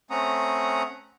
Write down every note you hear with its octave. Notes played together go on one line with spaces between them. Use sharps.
A3 C4 C#4 F#5 A#5 D#6